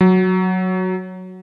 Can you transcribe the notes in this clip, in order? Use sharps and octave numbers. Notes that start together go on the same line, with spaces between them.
F#3